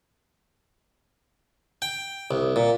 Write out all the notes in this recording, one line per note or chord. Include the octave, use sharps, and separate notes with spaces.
G5
C2
A#2